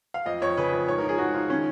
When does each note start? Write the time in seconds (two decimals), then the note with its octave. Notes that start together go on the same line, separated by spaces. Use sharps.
0.14 F5
0.26 F2 D#5
0.42 F2 C#5
0.57 C#3 B4
0.73 F2
0.88 G#2 C#5
0.98 F3 A#4
1.09 G#4
1.18 G#2 F#4
1.34 F3 F4
1.49 D#3 C#4